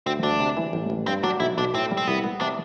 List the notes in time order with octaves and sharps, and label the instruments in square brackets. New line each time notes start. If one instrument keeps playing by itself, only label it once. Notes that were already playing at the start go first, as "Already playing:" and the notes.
[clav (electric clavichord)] D2 [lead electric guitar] C4
[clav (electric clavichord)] D2 [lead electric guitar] D4
[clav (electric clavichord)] C3
E3
A1
A1
[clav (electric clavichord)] G2 [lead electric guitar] C4
[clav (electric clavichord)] F#3 [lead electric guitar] D4
[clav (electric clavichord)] B1 [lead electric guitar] E4
[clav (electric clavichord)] B1 [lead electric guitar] D4
[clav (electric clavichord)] A2 [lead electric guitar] C4
[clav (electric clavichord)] G3
[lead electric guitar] C4
[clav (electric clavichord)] C2 [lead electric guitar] B3
[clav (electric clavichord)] B3
[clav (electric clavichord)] C3 [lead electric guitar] D4